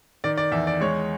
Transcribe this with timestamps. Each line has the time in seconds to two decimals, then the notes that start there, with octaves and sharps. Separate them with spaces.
0.24 D#3 D5
0.37 D5
0.52 E2 E5
0.67 D5
0.81 G#3 C#5